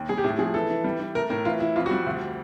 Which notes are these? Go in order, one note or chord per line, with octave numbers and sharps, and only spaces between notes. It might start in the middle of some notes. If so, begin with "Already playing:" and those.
Already playing: D#2
G3 G#4
G4
A2 G#4
F3 G#4
E3 A4
E3
G3
E3
A3 A#4
A2 A#4
E3 F4
E3 E4
F2 F4
F#4
G3
D2